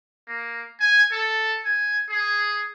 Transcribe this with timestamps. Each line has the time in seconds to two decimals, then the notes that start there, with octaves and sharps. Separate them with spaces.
0.28 A#3
0.80 G#5
1.12 A4
1.65 G#5
2.10 G#4